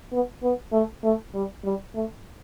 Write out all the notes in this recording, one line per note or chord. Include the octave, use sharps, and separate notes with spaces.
B3
B3
A3
A3
G3
G3
A3